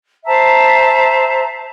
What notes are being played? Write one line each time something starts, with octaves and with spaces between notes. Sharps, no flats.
C5 E5 A5 A#5